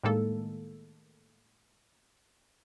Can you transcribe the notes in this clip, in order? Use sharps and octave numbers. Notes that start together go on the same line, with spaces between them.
A2 D#3 G#3 A#3 A4